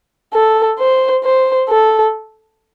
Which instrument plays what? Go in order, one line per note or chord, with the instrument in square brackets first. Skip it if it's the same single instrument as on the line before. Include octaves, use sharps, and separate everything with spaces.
[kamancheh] A4
C5
C5
A4